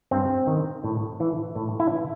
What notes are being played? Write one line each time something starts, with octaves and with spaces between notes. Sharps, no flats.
G2 C4
D#3
A2
E3
A2
E4
E3